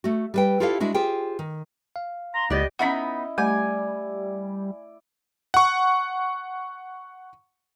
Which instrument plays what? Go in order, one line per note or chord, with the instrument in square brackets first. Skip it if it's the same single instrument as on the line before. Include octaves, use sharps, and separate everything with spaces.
[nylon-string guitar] A3 F#4
G3 B4 G5
E4 F4 G4 A4 C#5 F5
G#3 D4 E4 F#4
F4 G4 G#4 C5 G5
D#3
[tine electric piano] F5
[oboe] A#5 [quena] C6
[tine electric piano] C#2 [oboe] B3 [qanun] G4 D5 [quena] D#5
[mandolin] B3 D#4 B5 [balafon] C#4 E5 F#5 [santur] E4 D#5
[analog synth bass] G3 [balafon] A3 [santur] D5 [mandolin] G#5
[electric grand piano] F#5 C#6